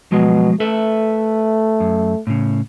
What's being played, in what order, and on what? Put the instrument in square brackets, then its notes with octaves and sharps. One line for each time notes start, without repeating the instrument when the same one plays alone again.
[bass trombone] B2 [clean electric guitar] F3 F#3 G#3
[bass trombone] A3 [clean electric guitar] A4 B4 E5
[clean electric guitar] F#2
A2 C#3